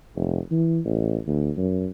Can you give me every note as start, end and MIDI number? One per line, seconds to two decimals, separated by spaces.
0.16 0.39 29
0.51 0.79 52
0.85 1.19 33
1.27 1.51 38
1.57 1.89 42